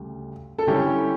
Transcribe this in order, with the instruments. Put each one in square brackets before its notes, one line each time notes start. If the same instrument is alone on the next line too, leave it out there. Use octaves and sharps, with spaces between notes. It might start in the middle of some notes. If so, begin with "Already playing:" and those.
Already playing: [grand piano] D2 C#3 G3
[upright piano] A4
[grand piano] D3 G3 C#4 E4 [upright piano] G4